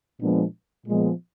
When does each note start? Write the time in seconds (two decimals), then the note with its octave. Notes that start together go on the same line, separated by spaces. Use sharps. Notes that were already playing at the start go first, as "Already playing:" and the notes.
0.19 A#2 F3 G#3 B3 D4
0.86 A#2 F3 G#3 B3